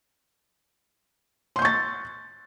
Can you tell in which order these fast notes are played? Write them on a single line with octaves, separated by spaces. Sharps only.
C6 G6 C#6 A6